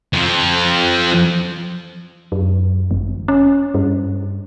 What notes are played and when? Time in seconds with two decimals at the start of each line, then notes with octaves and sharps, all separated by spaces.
0.13 F2 F3
2.32 F#2
2.91 G1
3.28 C#4
3.74 G2